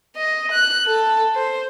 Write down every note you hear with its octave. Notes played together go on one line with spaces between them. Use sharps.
D#5
F#6
A4
C5